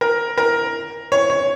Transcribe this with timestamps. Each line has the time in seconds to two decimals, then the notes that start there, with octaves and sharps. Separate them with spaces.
0.01 A#4
0.38 A#4
1.12 C#5
1.30 C#5